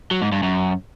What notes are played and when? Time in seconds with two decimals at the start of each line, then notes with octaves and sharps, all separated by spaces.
0.11 F#3
0.22 G#2
0.32 G2
0.43 F#2